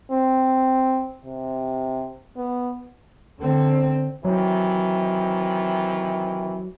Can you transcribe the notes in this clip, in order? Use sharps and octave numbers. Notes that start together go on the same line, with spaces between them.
C4
C3
B3
D3 C4
C3 D#3 E3 F#3